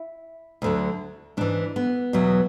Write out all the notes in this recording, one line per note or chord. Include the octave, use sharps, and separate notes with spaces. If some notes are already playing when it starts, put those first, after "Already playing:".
Already playing: E4
D2 D3 F#3
G#2 E3 D4
B3
E2 B2 F#3